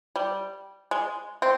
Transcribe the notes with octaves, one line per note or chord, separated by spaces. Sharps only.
G3
G#3
C4